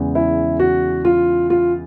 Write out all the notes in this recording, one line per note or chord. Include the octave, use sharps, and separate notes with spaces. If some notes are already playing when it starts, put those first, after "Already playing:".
Already playing: E2 C#3 E3 G#3
E4
F#4
F4
F4